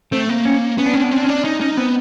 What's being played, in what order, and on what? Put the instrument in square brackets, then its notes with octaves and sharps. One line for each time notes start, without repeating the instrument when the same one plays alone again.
[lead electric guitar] A3 [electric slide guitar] C4
[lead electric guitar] A#3
[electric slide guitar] C#4
[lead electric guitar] B3 [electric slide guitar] C#4
[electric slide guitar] D4
[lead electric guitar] C4 [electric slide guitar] C#4
[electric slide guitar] D4
[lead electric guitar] B3
[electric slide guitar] C#4
[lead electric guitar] C4
[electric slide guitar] D4
C#4
[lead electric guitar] D4
[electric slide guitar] C#4 [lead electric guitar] D#4
[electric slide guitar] C#4 [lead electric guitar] D#4
[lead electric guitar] B3 [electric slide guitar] C4